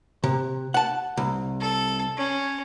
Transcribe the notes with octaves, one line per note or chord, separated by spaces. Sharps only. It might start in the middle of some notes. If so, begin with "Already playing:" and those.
C3
F#5 A5
C2
A4
C#4